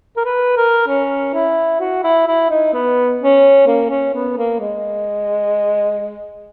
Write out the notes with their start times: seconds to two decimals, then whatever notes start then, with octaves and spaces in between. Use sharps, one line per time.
0.17 A#4
0.25 B4
0.57 A#4
0.87 C#4
1.34 E4
1.80 F#4
2.04 E4
2.27 E4
2.50 D#4
2.73 B3
3.21 C#4
3.67 A#3
3.90 C#4
4.14 B3
4.37 A#3
4.60 G#3